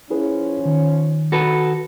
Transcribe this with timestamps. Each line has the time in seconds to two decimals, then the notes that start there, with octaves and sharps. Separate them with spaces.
0.10 F3 C#4 E4 G#4 B4
0.65 D#3
1.32 F#4 A4 B4